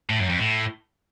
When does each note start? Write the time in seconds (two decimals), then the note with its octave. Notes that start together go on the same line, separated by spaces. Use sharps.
0.10 A2
0.20 F#2
0.29 F2
0.39 A2